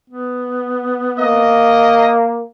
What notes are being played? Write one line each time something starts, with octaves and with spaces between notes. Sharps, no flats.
B3
A#3 D#5